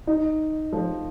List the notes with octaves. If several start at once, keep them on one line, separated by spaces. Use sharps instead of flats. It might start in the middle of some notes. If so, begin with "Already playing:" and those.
D#4
F3